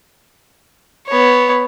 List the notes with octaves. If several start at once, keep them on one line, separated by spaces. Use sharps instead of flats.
B3 C#5